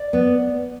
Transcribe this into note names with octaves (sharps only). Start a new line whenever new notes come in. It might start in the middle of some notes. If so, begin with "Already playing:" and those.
Already playing: D5
B3